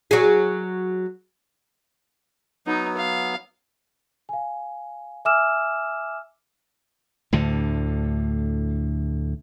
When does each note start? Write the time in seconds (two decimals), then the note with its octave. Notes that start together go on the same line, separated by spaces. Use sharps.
0.11 F#3 G#4
2.67 F#3 B3 D#4
2.98 F5
4.29 F5 G#5
5.25 E5 G#5 D6 E6 F6 E7
7.33 D2 A2 D3